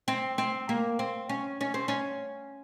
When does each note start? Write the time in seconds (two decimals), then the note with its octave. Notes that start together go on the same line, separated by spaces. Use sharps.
0.08 C4
0.38 C4
0.69 A#3
0.99 C4
1.29 C#4
1.61 C#4
1.74 C4
1.88 C#4